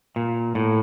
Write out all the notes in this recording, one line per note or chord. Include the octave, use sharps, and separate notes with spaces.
A#2
A2